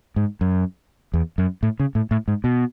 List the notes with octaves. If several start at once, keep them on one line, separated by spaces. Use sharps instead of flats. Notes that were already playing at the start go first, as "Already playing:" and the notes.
G#2
F#2
E2
F#2
A2
C#3
A2
A2
G#2
B2